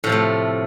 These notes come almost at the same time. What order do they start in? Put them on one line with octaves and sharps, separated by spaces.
A2 F3 C3 A3